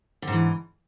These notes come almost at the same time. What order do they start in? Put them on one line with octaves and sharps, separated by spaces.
D3 G#2 E3